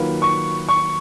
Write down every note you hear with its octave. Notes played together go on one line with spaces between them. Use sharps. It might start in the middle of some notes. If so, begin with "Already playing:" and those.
Already playing: D#3 F#3 A#3 F4 B4
C#6
C#6